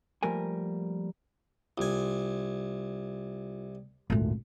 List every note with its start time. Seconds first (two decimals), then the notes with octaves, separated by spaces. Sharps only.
0.23 F3 G3 A3 A#3 A#4 G#5
1.78 C2 F4 G#5
4.10 G#1 D2 A#2 A3